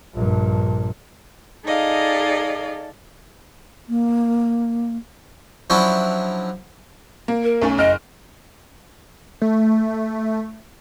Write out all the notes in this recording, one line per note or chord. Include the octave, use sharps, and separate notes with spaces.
A#1 G2
D#4 G#4 A4 D5 D#5 F5
A#3
F3 F#3 C#4 D4 E4
A#3
A#4
B1 A3 C#4
F#1 D#5 F6 D7
A3